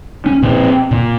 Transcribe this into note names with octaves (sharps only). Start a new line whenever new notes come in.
C#4
A#2 C4
A#2